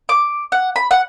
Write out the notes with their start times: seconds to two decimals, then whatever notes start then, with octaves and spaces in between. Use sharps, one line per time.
0.09 D6
0.52 F#5
0.76 B5
0.91 F#5